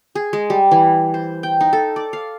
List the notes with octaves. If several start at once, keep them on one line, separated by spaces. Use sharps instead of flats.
G#4
G#3
G3
E3
C5
G5
D#4
A4
D5
F5